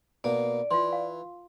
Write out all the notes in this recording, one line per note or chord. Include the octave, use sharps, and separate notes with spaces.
B2 A#3 D#4 D5
E3 F4 C6
F5